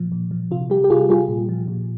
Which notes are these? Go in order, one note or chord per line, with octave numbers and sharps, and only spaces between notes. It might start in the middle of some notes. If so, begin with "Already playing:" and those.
Already playing: A#2 F3
A#2
F3
C3 F4
G3 G4
G4
C3 F4 G#4
G3 F4 G#4
A#2
F3
A#2